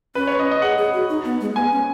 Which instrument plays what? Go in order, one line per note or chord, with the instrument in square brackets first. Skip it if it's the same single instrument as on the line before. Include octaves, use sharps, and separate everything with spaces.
[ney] C#4 [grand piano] B4
[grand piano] C#5
D#5
D#5
[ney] G#4 [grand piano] F#5
[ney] G#4
F#4
D#4
B3
G#3
[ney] B3 [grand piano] G#5
[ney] C#4